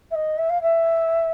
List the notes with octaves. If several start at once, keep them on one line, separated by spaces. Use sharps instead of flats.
E5
D#5
E5
F5
E5